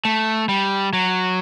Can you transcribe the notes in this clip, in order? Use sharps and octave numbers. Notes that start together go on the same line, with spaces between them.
A3
G3
F#3